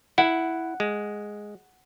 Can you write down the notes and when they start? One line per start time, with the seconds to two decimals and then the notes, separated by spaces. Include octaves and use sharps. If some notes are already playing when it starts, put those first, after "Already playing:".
0.18 E4 F#5
0.80 G#3